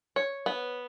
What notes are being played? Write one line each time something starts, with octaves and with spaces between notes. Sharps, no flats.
C#5
B3